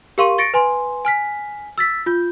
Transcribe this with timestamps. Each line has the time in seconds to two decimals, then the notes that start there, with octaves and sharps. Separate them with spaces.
0.18 G4 A#4 F5 C6 C#6 D#7
0.38 C#6 A6 A#6 C#7 D7
0.54 B4 G#5 C6
1.05 G#5 F6 B6
1.78 E6 A6 B6
2.06 F4 G6